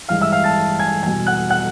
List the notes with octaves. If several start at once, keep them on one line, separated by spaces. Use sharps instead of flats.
A1 G2 E3 G#3 F5 F6
E5 E6
F5 F6
A5 A6
G#5 G#6
E2 B2 G3 G#5 G#6
F#5 F#6
F#5 F#6